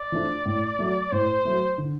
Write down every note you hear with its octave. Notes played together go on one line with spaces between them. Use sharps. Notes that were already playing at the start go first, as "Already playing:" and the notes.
Already playing: D5
F3 A3 D4
A2
F#3 A3
A2 C5
F#3 A3
D3